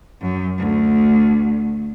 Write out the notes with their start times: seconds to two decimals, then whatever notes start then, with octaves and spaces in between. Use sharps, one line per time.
0.21 F#2
0.58 D2